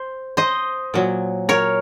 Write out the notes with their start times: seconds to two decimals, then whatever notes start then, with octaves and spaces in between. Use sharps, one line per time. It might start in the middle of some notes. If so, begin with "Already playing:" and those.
Already playing: C5
0.37 C5 D#5
0.94 A#2 F#3
1.49 A#4 C#5